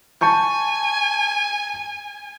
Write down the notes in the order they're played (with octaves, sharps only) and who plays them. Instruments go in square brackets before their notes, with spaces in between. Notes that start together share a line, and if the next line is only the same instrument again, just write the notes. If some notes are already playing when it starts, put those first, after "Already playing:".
[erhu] G#5 [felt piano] A5 C#6 G6